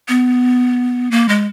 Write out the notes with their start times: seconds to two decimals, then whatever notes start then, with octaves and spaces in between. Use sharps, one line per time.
0.08 B3
1.11 A#3
1.29 G#3